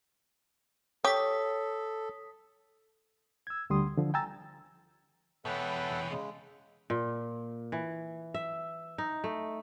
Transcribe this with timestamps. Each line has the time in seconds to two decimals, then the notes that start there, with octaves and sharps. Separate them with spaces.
1.05 G4 A4 C#5 D#6 B6
3.47 E6 G#6
3.70 D2 D3 G3 C6 D#6
3.97 D3 F3
4.14 G5 G#5 A#5 E6 A6
5.45 E2 B2 A4 B4 C#5 E5 F#5 G5
6.11 C#3 G#3
6.90 A#2
7.72 E3
8.34 E5
8.98 D#4
9.24 A3